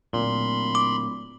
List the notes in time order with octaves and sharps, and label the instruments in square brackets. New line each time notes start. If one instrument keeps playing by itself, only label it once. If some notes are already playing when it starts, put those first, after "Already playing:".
[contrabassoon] D1 [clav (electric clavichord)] A#2 [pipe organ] B5 C6
[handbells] D6